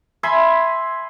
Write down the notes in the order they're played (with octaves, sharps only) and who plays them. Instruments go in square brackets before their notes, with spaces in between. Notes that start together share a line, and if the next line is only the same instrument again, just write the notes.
[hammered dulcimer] E5 G#5 B5 C6